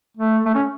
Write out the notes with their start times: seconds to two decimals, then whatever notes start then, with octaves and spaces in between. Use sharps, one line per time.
0.17 A3
0.46 A3
0.54 C#4